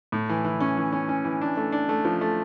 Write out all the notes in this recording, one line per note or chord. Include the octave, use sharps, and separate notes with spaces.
A2
E3
E3
C#4
E3
C#4
C#4
E3
D4
A3
D4
A3
F3
A3